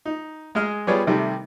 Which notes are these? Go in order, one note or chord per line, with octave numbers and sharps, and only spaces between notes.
D#4
G#3 G#4 D#5 F6
G3 B3 F4 G#4 C#5 D5
C3 D#3 G3 A3